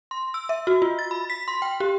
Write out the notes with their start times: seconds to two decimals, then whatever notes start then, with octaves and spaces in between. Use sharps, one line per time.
0.11 C6
0.34 E6
0.49 E5
0.67 F#4
0.82 F4
0.99 A6
1.11 B5
1.30 B6
1.48 C6
1.62 G5
1.80 G4